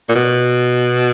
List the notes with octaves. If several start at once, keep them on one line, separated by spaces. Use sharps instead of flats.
A#2
B2